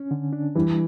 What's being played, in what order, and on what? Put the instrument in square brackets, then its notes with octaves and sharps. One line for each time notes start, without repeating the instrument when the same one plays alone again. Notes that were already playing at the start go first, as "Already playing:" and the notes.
Already playing: [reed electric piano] C#4
D3
D4
[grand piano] E3 [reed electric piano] G3